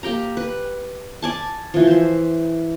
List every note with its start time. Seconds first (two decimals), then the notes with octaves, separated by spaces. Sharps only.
0.03 A#3 G4 G5 A#5
0.37 B4
1.22 D5 G#5 A5
1.74 E3 F3
1.87 C5 E5